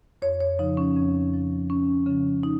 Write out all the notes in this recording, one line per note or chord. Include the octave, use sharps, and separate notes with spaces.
F2 C#5
C#5
C#3 F3 D#4
C#4
F2 C4
C#3 F3
F2 C#4
C#3 F3 C#4
D#4